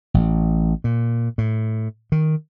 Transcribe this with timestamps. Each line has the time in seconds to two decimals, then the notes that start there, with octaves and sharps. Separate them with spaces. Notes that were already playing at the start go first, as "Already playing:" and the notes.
0.14 A1
0.84 A#2
1.38 A2
2.12 D#3